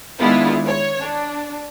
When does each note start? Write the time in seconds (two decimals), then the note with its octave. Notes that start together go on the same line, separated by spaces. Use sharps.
0.19 D#3 G#3 B3 D4 E4 F4
0.65 C#5
0.99 D4